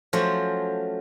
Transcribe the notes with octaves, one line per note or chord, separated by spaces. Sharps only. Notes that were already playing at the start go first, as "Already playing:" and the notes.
F3 F#3 A3 C#4 F#4 C5